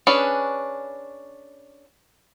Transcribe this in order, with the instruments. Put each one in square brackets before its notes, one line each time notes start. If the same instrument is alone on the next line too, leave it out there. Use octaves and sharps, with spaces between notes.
[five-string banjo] C#4 D4 G#4 B4